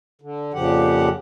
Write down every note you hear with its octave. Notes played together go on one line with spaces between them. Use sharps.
D3
F2 A#2 C#3 F3 G4 F#5